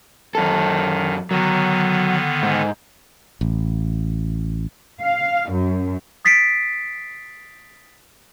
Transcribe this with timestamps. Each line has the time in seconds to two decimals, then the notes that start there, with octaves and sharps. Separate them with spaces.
0.35 F#2 D#3 A4
1.31 D3 D#3 F#3 B3
2.43 G#2
3.41 A1
5.01 F5
5.50 F#2
6.25 D#6 A6 B6 C7 D7